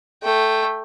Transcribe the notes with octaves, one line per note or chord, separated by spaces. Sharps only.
A3 G5